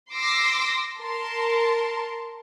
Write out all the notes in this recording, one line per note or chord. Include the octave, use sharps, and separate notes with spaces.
C6 D6 E6 A#6 C7
A#4 A5 C6